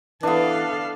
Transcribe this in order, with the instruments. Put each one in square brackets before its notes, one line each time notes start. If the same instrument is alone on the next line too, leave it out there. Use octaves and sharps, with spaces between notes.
[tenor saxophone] E3 [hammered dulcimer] B3 D4 [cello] A4 F5